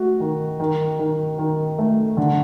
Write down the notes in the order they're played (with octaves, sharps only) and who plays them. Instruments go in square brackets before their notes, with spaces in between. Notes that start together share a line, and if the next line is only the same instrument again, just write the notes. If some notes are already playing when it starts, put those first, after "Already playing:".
Already playing: [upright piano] A3 F#4
D#3
D#3
D#3
D#3
A3
D3